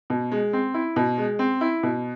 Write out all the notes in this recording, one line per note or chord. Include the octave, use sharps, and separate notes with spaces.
B2
G#3
C4
E4
B2
G#3
C4
E4
B2